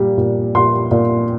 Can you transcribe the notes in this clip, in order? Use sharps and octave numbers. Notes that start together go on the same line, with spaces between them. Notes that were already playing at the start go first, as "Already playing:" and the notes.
Already playing: A#2 G3
A#2
A#2 C6
A#2